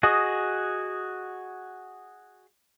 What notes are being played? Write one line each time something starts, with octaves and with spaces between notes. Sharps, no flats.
F#4 G#4 D#5